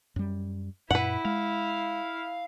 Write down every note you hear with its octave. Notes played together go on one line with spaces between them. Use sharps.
F#2 G3
F#2 A#2 E4 B4 F#5
G#3 F5